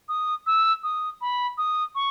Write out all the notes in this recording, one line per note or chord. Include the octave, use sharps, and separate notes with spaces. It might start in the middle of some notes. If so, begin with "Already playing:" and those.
D#6
E6
D#6
B5
D#6
C#6